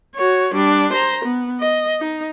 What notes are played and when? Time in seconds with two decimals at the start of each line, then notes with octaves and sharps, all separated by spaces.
0.15 F#4 C#5
0.54 G3 D4
0.93 C5 A#5
1.25 B3
1.60 D#5
2.00 D#4